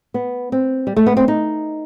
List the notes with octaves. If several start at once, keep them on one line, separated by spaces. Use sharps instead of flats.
B3
C4
G3
A3
B3
C4
D#4